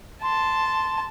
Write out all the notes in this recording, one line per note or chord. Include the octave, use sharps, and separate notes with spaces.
A5 C6